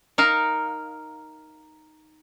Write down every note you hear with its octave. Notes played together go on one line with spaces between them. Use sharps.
D#4 A#4 F5